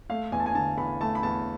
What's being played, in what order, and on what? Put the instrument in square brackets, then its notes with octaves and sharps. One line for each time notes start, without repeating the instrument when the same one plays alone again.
[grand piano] A3 F5
E2 G#5
A5
G#5
D3 A5
E2 B5
A3 A5
B5
E2 A5